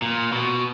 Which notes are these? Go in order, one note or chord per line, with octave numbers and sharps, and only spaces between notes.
A#2
B2